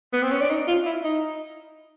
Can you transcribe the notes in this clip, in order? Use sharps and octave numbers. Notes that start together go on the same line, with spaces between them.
B3
C4
C#4
D4
D#4
F4
E4
D#4